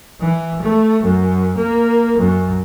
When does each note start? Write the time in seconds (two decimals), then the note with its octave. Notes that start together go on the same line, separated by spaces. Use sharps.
0.20 E3
0.62 A3
1.03 F#2
1.57 A#3
2.18 F#2